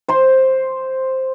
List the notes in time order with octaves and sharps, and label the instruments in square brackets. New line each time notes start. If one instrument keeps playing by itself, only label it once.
[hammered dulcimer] C5 C6